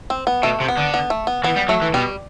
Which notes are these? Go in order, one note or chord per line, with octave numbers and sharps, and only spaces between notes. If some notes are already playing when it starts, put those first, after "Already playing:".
C4
B3
B2 A3
C3
B3
D3
B3
A3
B3
E3 B3
G3
F#3 A3
E3
B2 G3